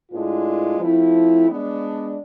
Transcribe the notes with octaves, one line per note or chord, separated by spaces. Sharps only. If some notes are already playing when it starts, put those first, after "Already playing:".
A2 G#3 D4 F4 B4
F3 A3 C4 E4
G#3 B3 D4